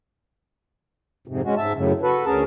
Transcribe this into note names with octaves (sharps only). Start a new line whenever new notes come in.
F2 G#2 C3
G#3 C#4 F#4
G#2 E5 A5
F#2 A2 C#3
F#4 A4 B4
D2 C#4 G#4 A#4 A5